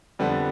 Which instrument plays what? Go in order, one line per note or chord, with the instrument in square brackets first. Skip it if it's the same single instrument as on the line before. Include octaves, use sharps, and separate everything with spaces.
[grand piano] F2 D3 G3 B3